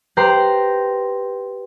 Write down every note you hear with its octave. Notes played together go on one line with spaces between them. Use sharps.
G4 B4 C5 A#5 C6